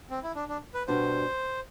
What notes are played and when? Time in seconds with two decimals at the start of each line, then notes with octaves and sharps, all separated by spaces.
0.10 C4
0.23 E4
0.35 D4
0.48 D4
0.74 B4
0.88 B2 G3 D4 F#4 B4 C5